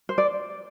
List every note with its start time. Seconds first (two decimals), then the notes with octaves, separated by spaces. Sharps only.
0.09 C5
0.18 D5